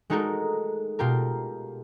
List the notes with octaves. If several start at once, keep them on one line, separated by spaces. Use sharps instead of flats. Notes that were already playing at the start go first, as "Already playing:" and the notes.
G#3 A3 D#4 F#4 A4 A#4
B2 F4 G4 A#4